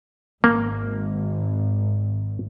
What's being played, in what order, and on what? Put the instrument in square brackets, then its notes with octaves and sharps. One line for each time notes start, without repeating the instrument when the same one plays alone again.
[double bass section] G#1 [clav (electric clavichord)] A#3